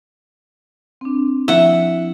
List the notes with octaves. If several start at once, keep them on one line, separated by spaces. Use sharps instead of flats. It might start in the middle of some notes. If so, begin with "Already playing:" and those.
C4 D4
F3 E4 E5 F#5